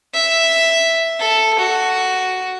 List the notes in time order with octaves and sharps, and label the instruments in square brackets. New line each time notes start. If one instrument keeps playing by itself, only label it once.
[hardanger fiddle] E5
A4
F#4